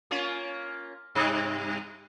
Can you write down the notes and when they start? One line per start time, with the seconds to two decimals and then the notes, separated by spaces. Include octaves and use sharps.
0.11 A#3 C#4 F4
1.15 G2 C3